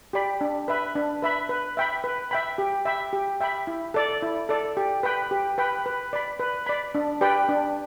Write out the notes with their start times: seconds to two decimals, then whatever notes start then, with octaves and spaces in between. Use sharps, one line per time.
0.13 G4 D5 B5
0.41 D4
0.68 B4 E5 B5
0.95 D4
1.22 B4 E5 B5
1.49 B4
1.77 E5 G5 B5
2.04 B4
2.31 E5 G5 B5
2.58 G4
2.85 E5 G5 B5
3.13 G4
3.41 E5 G5 B5
3.67 E4
3.94 A4 D5
4.22 E4
4.49 A4 D5
4.77 G4
5.03 B4 G5 B5
5.31 G4
5.58 B4 G5 B5
5.86 B4
6.13 D5 B5
6.40 B4
6.66 D5 B5
6.95 D4
7.21 G4 B4 D5 G5
7.49 D4